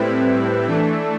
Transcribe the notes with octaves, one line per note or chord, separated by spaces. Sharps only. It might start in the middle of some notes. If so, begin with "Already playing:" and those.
Already playing: A2 G3 C4 E4 B4
E3 A3 D4